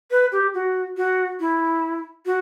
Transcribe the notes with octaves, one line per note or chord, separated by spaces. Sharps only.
B4
G4
F#4
F#4
E4
F#4